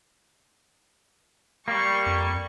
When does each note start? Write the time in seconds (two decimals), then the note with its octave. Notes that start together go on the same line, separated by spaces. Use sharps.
1.68 G3 A#3 C#6
2.06 F2